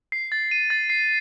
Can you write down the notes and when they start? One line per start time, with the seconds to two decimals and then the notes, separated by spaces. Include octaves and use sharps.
0.12 C7
0.32 A6
0.51 D#7
0.70 A6
0.90 C7